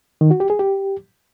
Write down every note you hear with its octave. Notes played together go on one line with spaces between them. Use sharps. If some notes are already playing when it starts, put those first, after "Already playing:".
D#3
F#4
G4
G#4
G4